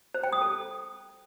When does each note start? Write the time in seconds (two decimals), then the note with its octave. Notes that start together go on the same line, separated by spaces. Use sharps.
0.14 C5
0.23 G5
0.33 D#6
0.42 A4